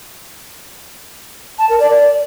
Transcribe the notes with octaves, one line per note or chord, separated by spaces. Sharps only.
A5
A#4
D5